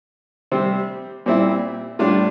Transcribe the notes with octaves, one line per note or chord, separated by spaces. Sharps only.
C3 G3 C4
A#2 G3 C4 E4
A2 G3 D4 F4